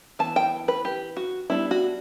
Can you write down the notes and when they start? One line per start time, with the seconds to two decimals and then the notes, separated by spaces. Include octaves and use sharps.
0.19 E3 B3 A5
0.36 G5
0.68 B4
0.85 G4
1.17 F#4
1.50 G3 B3 D4 E4
1.71 F#4